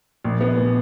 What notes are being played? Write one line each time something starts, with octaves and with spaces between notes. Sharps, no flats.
A#1
B3
A#2